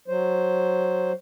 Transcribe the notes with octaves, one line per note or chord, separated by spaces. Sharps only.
F#3 C5